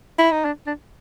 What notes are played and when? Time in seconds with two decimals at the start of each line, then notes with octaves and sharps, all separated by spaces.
0.18 E4
0.32 D#4
0.45 D4
0.67 D4